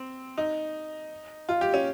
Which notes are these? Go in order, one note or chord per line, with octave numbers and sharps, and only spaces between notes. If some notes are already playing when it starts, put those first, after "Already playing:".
Already playing: C4
D#4
F4
G4
C#4